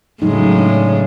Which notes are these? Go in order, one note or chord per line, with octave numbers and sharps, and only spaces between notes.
A2 C#3 F#3 G#3 D#4
D4